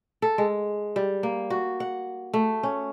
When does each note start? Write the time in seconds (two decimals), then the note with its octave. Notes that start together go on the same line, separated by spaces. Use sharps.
0.22 A4
0.38 G#3
0.96 G3
1.23 A#3
1.50 F#4
1.80 F#5
2.34 A3
2.63 C#4